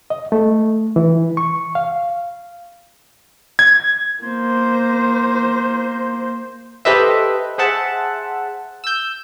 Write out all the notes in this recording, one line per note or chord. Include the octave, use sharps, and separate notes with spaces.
D#5
A3
E3
C#6
F5
G#6
A#3 C5
G4 A4 B4 C5 D#5 E5
G#4 C5 E5 F#5 A5
E6 G6